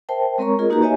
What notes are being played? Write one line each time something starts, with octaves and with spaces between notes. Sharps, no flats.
A#4 C5 E5 G5 A5
G#3 C4 A#4 C#5 A#5 C#6
F4 G#4 A#4 D#5
A#3 D#4 F#4 G4 B4 A#5
G4 C#5 D#5 E5 G#5